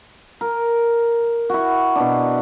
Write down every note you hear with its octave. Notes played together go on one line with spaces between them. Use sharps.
A#4
E4 F#4
B2 D4